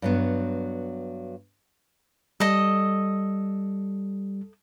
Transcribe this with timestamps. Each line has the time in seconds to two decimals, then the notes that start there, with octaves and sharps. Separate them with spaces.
0.02 G2 F#3 B3
2.40 G3 A4 D#5